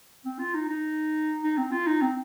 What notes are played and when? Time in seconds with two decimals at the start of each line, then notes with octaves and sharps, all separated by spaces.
0.25 C4
0.39 F4
0.54 D#4
0.69 D#4
1.43 D#4
1.57 C4
1.71 F4
1.87 D#4
2.01 C4